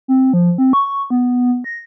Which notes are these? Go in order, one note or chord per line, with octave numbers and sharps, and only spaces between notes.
C4
F3
C4
C#6
C#6
B3
A#6